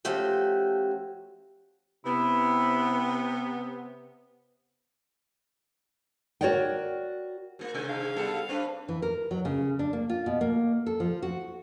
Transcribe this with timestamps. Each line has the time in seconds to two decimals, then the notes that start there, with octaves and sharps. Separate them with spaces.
0.05 F3 A3 C#4 F#4 G4
2.05 C3 B3 E4
6.41 F#4 A#4 C#5 D5 F#5 G5
7.59 G#2 A#3
7.74 G#2 C3 D#4
7.89 F5
8.16 G3 B3 A4
8.49 C4 D4 B4
8.89 E3
9.02 A#4
9.31 F#3
9.45 C#3
9.79 D4
9.93 A#3
10.10 F4
10.26 B2
10.41 A#3
10.86 A4
11.00 F3
11.22 F#4